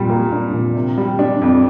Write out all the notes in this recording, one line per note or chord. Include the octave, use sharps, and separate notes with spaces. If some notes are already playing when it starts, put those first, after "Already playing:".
Already playing: A#2 G3
A#3
D4
A#2
C3
G3
D4
F2